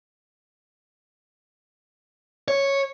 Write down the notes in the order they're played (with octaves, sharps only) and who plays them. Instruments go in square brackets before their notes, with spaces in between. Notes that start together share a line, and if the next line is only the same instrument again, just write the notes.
[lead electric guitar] C#5